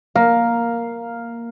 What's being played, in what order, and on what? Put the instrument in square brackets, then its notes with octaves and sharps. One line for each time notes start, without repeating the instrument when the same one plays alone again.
[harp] A#3 [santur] F5